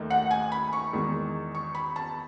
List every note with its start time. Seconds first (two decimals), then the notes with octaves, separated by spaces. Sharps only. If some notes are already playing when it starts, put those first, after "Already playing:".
Already playing: D#2 D#3 A3 D#4
0.10 F#5
0.31 G#5
0.52 B5
0.73 C#6
0.93 E2 D#3 G#3
1.55 C#6
1.75 B5
1.96 A5